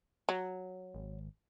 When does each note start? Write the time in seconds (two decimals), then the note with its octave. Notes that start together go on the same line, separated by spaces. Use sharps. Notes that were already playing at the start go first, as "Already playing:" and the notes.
0.29 F#3
0.94 G#1